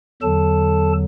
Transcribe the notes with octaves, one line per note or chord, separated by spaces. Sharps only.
E2 D3 F#3 A4 A5